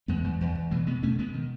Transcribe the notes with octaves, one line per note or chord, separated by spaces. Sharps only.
E2 G#3 B3
E2
E2
E2
B2 E3 G#3
B2 G#3 B3
B2 A3 C#4
B2 G#3 B3
D#3